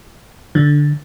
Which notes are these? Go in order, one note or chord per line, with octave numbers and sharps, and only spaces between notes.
D3